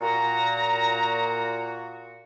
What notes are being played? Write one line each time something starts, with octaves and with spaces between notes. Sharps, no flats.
A#2 F#4 A#5